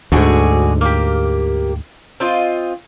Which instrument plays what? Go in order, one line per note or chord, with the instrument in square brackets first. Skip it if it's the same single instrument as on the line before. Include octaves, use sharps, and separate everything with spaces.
[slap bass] D2 G#2 [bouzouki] D3 F#4 G#4
[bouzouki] A#3 G4
C4 F4 D#5